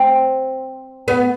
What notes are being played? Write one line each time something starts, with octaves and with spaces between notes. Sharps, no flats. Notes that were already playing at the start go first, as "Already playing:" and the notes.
Already playing: C4
B3